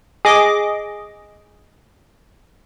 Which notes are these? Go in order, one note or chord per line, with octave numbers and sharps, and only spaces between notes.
G#4 D#5 D6